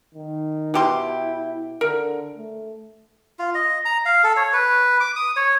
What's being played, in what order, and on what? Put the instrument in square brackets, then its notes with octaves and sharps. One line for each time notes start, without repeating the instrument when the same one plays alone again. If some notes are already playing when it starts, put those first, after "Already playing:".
[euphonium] D#3
[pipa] B2 G4 C6 [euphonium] E4
[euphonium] D3 [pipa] A#4
[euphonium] A3
[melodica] F4
D#5
A#5
F5
A4
C#5
B4
D6
D#6
C#5